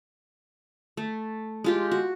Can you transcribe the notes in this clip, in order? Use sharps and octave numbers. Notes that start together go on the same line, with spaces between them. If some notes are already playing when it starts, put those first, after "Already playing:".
A3
G#3 F4 G4
F#4